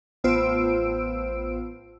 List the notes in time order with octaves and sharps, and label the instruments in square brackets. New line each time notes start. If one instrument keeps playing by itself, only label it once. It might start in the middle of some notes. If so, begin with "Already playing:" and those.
[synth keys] A1 B3 F4 C5 E6 D7